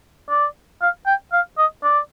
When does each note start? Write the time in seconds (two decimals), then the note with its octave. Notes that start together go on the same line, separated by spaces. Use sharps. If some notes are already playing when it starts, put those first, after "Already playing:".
0.30 D5
0.82 F5
1.06 G5
1.33 F5
1.58 D#5
1.83 D5